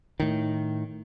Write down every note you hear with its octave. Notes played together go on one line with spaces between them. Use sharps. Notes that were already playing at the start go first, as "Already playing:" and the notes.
A2 D#3